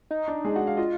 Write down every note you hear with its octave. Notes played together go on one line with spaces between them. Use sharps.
D#4
D4
G#3 G#4
F#4 F#5
F5
F4 D#5